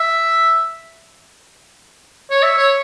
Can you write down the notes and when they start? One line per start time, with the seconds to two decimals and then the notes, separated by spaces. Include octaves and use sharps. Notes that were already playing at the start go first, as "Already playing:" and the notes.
Already playing: E5
2.30 C#5
2.43 E5
2.58 C#5